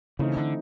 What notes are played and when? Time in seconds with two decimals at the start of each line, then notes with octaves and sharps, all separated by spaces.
0.19 C#3 E3 A3 C4 D#4
0.37 D3